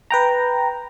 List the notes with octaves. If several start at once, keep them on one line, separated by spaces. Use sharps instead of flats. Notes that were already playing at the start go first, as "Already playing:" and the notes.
B4 G5 A#5